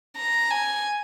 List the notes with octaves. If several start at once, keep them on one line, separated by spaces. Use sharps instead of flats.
A#5
G#5